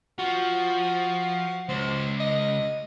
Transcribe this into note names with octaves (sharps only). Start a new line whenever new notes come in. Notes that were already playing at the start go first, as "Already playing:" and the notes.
F3 F#4
C#2 C5
D#5